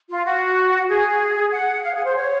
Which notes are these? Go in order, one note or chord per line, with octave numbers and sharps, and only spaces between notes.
F4
F#4
G#4
F#5
F5
G#4
C5
C#5